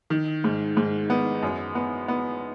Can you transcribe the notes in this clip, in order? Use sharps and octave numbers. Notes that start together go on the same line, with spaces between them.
D#3
G#2
G#2
B3
F#2
B3
B3